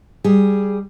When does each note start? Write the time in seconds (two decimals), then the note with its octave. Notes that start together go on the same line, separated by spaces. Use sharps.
0.24 G3 G#4